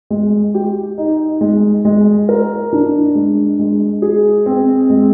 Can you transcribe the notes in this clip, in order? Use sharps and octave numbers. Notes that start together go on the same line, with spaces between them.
G#3
G4
D#4
G#3
G#3
A#4
D4
G#3
G#3
G#4
C4
G#3